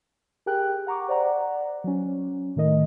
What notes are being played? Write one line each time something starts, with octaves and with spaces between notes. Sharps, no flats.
G4 G#4 A#4 G5 F#6
F#5 A#5 C#6 D6
C5 D5 F#5 A#5
F#3 C#4
A2 D#3 A3 A#4 D#5